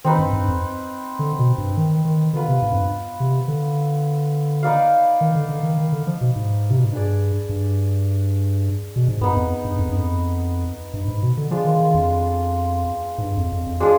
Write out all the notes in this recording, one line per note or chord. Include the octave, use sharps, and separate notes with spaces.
D#3 C4 D#4 B4
G2
G2
F2
D3
B2
G2
D#3
D#3
D3 B3 F4 B4
C3
G#2
F2
G2
C3
D3
D#4 B4 D5 F5
D#3
D3
D3
D#3
D#3
D3
F3
B2
G#2
C3
B2
G#2
G2 D4 G#4 D5
G2
B2
G#2
G2 B3 D#4 B4
F2
G2
F2
G2
F2
G2
G#2
B2
D3
F3 G#3 D4 F4
D#3
D#3
F2
G#2
G2
F2
F2
F2
G#3 D4 F4 G#4